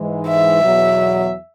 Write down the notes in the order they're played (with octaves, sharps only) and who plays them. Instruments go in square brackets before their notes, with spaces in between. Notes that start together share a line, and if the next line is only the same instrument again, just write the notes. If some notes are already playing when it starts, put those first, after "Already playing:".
Already playing: [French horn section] G#2 E3 G#3
[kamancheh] E5
[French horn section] E2 B2 F#3